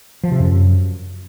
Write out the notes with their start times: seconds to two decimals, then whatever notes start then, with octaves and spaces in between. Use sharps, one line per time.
0.24 F3
0.32 C3
0.40 F#2